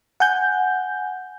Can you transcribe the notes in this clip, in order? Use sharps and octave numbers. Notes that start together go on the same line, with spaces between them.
F#5 G#5 G6